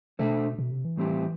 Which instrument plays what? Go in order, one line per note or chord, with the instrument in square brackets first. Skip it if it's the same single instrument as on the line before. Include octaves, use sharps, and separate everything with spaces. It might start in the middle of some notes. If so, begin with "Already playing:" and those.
[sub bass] B2 [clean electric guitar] A3 D4 A4 C5 E5
[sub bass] B2
C3
E3
[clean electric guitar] A2 G3 C4 E4 G4